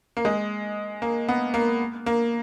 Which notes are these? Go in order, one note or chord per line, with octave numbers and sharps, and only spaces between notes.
A#3
G#3
A#3
B3
A#3
A#3